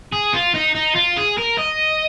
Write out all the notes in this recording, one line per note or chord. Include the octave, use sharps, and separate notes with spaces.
G#4
F4
D#4
D#4
F4
G#4
A#4
D#5